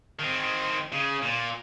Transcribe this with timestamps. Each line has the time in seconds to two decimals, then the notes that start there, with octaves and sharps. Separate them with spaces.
0.19 D#3 C4
0.92 C#3
1.22 A#2